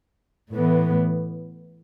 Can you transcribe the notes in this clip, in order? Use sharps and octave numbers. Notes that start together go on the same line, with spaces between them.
A2 E3 B3